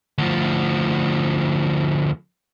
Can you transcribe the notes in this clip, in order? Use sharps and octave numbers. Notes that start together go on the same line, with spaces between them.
D2 F3